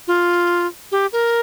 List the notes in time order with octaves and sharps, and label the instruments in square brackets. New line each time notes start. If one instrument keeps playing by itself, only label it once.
[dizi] F4
G4
A#4